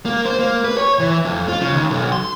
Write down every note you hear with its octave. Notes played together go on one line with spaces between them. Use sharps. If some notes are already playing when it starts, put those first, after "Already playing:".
A#3
C5
A#3
B4
C#5
E3
F2
F4
C#3
D#2
B1
C6